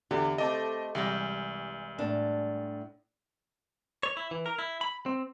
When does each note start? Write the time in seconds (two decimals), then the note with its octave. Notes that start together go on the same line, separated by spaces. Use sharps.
0.11 E2 D3 G4
0.38 A3 C4 A4 D#5 A5 D6
0.95 C2 E3 G3 G#3
1.99 A2 D4
4.03 C#5
4.17 E4
4.31 E3
4.46 A#4
4.59 E4
4.81 B5
5.06 C4